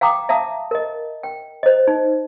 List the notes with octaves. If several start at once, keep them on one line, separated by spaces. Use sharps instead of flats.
F5 G5 A#5 D6 D#6
E5 F5 A5 A#5 D#6
A#4 D#5
G5
C5 D#5
D#4